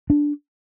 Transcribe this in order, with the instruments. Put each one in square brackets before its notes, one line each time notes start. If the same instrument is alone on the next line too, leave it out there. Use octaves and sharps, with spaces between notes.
[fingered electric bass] D4